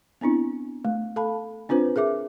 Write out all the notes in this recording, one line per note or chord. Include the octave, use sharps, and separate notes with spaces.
B3 C4 D4 E4
A3
A4 F5 A5 B5
C4 D4 F4 B4 C5
G#4 A#4 E5 D6